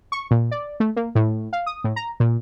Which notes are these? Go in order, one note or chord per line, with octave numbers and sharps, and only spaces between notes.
C#6
A#2
D5
A3
A#3
A2
F5
D#6
A2
A#5
A#2